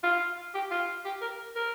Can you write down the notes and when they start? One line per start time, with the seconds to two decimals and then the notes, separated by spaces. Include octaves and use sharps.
0.04 F4
0.54 G4
0.71 F4
1.05 G4
1.21 A#4
1.56 A#4